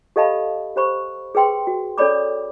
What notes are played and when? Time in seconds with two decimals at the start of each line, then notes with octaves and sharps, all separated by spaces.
0.16 G4 A4 D#5 F5 A5 B5
0.76 G4 C5 B5 C#6
1.35 G#4 B4 G5 C6
1.67 F#4
1.98 C#4 A4 C#5 D5 B5 D6